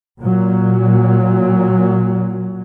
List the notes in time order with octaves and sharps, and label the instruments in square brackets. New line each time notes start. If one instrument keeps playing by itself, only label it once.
[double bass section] A#2 F#3